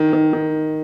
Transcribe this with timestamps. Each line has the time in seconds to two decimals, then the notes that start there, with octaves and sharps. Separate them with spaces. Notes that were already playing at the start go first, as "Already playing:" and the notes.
Already playing: D#3
0.13 D#3
0.33 D#3